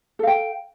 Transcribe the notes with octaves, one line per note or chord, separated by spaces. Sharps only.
A4 F5 G5